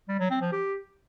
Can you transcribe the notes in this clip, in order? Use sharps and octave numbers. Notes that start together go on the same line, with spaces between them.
G3
F#3
C4
F3
G4